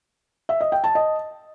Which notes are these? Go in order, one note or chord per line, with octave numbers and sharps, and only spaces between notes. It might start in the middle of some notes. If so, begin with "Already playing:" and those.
E5
D#5
G5
A5
D#5